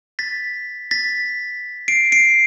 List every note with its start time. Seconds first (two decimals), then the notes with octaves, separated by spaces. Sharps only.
0.19 A6 B6
0.91 A6 B6
1.88 C7 D7
2.12 C7 D7